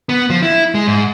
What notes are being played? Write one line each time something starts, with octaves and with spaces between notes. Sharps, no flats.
B3
F3
E4
G#3
G#2